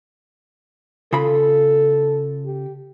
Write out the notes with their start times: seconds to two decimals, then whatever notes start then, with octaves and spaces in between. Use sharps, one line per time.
1.13 C#3 F4 A4 B5
2.45 G4